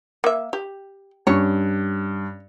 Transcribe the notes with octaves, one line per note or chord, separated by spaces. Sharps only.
A#3 E5
G4
G2 C#4 C#5